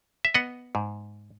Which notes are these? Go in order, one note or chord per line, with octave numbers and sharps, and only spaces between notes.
E5
B3 D#5 F#5
G#2